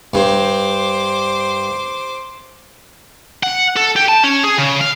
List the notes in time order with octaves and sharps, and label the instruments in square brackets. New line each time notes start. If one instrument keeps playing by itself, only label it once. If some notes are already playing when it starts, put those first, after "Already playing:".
[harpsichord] G2 [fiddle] C5 D6
[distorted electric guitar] F#5
A4
G4
A5
C#4
G#4
C#3
F5